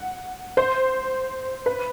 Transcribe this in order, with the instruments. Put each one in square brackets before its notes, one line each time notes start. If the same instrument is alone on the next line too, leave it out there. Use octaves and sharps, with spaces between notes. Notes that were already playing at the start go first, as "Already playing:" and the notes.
Already playing: [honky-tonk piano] F#5
C5
B4